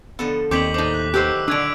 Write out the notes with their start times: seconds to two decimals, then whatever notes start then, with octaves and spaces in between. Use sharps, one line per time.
0.19 D3 F3 B3 A4
0.51 D#2 C4 G4 C#5 D#5 D6 B6 F#7
0.74 A2 C3 D#4 C5 D6
0.94 F#6
1.14 D#3 F#3 E4 G4 B4 C5 E6 F#6
1.48 A#2 D3 F#3 D4 E6 G#6 D7